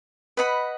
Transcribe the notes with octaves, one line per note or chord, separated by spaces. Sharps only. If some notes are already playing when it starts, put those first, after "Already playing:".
B4 D#5 F#5 B5